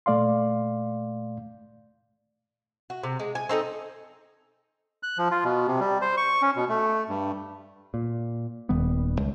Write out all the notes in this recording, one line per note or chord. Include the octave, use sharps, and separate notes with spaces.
A#2 A3 D5 F5 C6
F#4
C3
G#3
G#5
C4 D#4 A4 D#5
F#6
F3
F4
B2
C3
G3
C5
C#6
C#4
B2
A3
G2
A#2
D#1 D#3 G3 B3
C#2